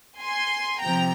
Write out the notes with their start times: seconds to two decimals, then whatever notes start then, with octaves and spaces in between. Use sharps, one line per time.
0.20 G#5 C6
0.81 C3 F3 G5 A#5